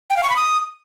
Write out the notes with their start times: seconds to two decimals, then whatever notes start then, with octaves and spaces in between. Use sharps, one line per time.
0.10 G5
0.17 F5
0.23 C#6
0.30 B5
0.36 D#6